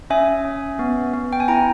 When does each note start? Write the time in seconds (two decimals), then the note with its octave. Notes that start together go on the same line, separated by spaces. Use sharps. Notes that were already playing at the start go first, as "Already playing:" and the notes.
0.10 C#4 E5 G#5
0.45 C#4
0.79 B3
1.13 B3
1.33 G5
1.40 G#5
1.48 E4 G5 A#5